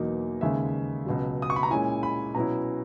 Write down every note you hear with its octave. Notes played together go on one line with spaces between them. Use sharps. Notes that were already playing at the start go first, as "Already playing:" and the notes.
Already playing: E2 B2 F#3 A#3 D#4
D#2 C#3 G#3 E5
C#2 B2 F#3
D#6
C#6
B5
A#5
A#2 G#3 C#4 E4 G#5
B5
B2 F#3 C#4 E4 A#5